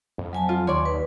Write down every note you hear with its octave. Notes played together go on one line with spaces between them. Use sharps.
F2
F#3 G#5 A5
F4
D#2 C#5 D5 C6
B4